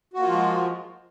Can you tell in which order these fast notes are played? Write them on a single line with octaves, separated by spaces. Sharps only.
F#4 A#3 F4 F3 G#3